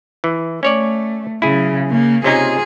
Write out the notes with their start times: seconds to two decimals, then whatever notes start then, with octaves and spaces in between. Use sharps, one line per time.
0.24 E3
0.63 A3 C#4 C#5 D5
1.42 C#3 F#3 E4 G#4
1.87 C#3 A#3
2.24 C3 C#4 D#4 F4 G#4